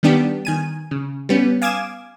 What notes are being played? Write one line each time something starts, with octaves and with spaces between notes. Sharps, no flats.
D#3 G3 B3 D4 G4
D#3 G#5 D#7
C#3
G3 B3 C#4
F5 G#5 D6 D#6 G#6 E7